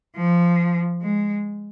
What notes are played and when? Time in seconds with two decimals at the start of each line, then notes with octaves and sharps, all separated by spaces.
0.16 F3
1.02 G#3